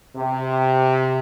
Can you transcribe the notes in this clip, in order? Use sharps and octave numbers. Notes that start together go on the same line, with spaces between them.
C3